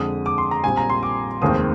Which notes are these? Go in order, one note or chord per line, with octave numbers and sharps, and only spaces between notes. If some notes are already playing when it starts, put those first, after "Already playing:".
Already playing: F2 D3 G#3 D#6
D6
C6
A#5
A#1 A#2 G3 C4 G#5
A#5
C6
D6
F1 D#2 D#3 G#3 C4 D#6